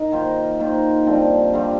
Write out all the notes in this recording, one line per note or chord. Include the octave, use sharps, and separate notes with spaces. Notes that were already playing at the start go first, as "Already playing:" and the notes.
Already playing: D#4 A#4
D#3 A#3 F4 C5
D#3 A#3 F4 C5
G2 D3 F3 C4
G2 D3 F3 C4